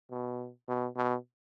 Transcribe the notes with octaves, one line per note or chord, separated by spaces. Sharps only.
B2
B2
B2